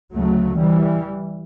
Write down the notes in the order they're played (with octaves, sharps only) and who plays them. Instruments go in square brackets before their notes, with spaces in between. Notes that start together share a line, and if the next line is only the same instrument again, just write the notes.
[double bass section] D2 C#3 F#3 A3
E3 G3